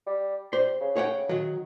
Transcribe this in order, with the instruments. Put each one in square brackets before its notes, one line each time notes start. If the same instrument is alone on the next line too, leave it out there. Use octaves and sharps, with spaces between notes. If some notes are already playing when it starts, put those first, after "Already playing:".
[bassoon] G3
[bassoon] G3 [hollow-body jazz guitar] C5
[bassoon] C#3
[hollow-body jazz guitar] C#5 F#5 G5
D#3 F#3